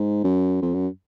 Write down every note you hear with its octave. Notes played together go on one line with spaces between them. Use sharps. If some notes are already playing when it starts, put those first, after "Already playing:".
Already playing: G#2
F#2
F2
F#2